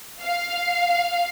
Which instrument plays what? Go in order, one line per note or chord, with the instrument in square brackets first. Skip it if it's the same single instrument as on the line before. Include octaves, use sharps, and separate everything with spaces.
[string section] F5